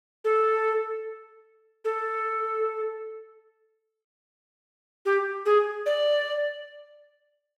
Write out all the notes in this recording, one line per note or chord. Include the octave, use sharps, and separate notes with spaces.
A4
A4
G4
G#4
D5